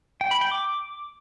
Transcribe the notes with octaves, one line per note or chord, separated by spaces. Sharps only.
G5
B5
G5
D6